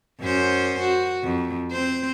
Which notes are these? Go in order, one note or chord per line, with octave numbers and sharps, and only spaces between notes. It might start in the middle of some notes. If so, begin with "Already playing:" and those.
F#2 C#4 C5
F#4
F2
C4 C5